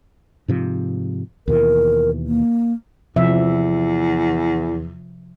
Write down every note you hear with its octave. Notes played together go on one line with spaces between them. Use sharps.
G#2 C3 F3
D#2 B2 E3 A#4
A#3
E2 C3 F3 E5